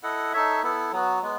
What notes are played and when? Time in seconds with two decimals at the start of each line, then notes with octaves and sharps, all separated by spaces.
0.03 E4 A4 D#5 F#5
0.33 D#4 A4 C#5 E5
0.63 B3 E4 A4
0.92 F#3 B3 F#4
1.22 G#3 B3